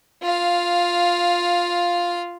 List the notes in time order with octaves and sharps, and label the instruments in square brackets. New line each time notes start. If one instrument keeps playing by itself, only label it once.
[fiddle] F4 F5